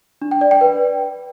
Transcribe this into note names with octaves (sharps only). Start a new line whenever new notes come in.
D4
G5
D5
G5
B4